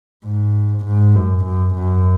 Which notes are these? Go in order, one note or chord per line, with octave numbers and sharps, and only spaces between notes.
G#2
G#2
F#2
F#2
F#2